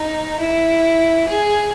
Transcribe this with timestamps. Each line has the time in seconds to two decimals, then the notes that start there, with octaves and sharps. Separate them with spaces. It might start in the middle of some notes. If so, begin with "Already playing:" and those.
Already playing: D#4
0.40 E4
1.28 G#4